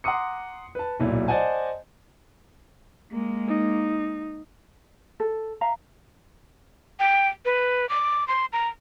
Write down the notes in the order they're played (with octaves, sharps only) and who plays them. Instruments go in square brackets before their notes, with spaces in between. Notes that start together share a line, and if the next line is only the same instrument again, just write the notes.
[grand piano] F#5 A#5 C6 D6 D#6 C#7
B4 A5
D1 B1 A#2 E4
C5 D5 D#5 F#5 G#5 A5
[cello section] G#3 A#3
[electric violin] D#4
[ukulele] A4
E5 F5 A#5
[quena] G5
B4
D6
C6
A#5